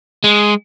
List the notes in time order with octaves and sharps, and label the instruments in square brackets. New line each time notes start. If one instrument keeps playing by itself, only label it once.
[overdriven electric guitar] G#3